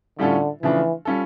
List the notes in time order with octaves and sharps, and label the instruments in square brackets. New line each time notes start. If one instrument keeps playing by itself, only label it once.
[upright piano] A2 G3 C#4 F4 A4 [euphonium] D3
[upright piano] C#3 F3 A3 D4 [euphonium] E3
[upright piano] G3 C#4 F4 A4